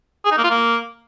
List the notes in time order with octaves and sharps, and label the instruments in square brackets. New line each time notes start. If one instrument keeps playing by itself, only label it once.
[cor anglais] G#4
D#4
A#3
F4
A#3